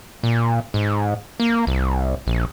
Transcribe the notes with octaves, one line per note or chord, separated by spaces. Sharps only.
A#2
G#2
A#3
C2
A#1